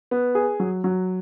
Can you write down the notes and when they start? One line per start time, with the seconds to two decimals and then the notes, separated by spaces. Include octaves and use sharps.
0.11 B3
0.35 G#4
0.60 F#3
0.84 F#3